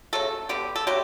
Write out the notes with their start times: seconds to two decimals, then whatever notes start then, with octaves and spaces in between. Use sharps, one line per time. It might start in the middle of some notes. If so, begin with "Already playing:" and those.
0.13 C#3 F#3 A3 A4
0.49 D3 G3 B3 G4
0.76 A4
0.87 D3 F#3 A3 G4